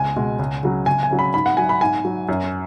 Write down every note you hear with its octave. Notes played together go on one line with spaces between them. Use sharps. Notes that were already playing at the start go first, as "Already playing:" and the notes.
Already playing: C#2 G#5
B2 G#3
C#2
C#3 F#3
C#2 G#5
G#5
C#3 F#3
B5
G#2 B5
F#5
F#3 G#5
B5
G#2 G#5
F#3
F#2